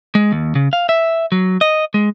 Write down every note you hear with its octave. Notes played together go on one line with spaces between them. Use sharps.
G#3
D#2
C#3
F5
E5
F#3
D#5
G#3